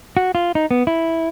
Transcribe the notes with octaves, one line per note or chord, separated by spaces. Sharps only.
F#4
F4
D#4
B3
E4